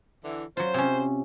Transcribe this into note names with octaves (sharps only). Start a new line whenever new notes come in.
D3 E3
F#3 F4 C5
C3 C#4